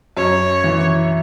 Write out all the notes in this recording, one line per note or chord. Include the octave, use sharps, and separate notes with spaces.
F#2 C#5
E3